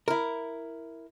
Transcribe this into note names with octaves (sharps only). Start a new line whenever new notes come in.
E4 A#4